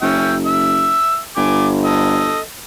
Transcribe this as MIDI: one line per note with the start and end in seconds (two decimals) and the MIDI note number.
0.02 0.98 30
0.02 0.34 61
0.02 0.34 76
0.02 0.34 79
0.46 1.19 76
0.46 1.19 88
1.37 2.39 31
1.37 1.67 80
1.37 1.67 86
1.85 2.39 69
1.85 2.39 75